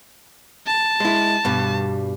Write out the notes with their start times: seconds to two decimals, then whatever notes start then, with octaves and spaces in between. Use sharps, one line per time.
0.67 A5
1.00 G#3 E4
1.45 G2 B2 G3